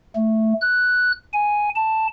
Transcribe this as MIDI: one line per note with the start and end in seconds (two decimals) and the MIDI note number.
0.16 0.53 57
0.61 1.12 90
1.33 1.69 80
1.76 2.07 81